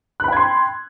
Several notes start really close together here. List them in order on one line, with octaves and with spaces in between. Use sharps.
F#6 B5 G5 G#6 C6